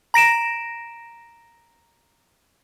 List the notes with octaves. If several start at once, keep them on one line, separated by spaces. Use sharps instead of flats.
A#5 A#6 D7 E7